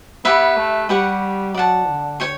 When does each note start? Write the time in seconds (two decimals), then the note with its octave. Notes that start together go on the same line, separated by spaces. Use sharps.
0.25 B3 G4 B4 E5
0.57 A3
0.89 G3 G4 B4 F#5 C#6
1.54 F#3 D5 F#5 A5
1.88 D3
2.20 C#5 G5 C#6